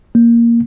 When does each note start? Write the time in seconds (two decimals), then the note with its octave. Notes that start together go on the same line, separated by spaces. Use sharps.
0.15 A#3